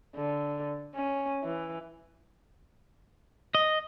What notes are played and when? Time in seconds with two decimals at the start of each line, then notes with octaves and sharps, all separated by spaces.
0.15 D3
0.95 C#4
1.44 E3
3.55 D#5